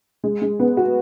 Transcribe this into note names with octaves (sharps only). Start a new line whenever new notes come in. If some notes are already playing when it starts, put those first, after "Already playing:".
G#3
G#3
B3
F#4